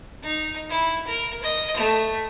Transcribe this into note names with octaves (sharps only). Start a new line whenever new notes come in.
D#4
E4
A#4
D#5
A3